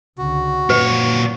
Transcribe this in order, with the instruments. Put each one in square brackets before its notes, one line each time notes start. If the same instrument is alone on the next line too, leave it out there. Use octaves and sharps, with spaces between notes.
[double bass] C#2 D3 [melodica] F#4
[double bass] F#2 [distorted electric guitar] A#2 C#5 [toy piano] B4